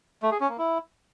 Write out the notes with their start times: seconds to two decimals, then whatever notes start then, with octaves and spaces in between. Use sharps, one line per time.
0.23 A3
0.32 G#4
0.40 C#4
0.49 A#3
0.58 E4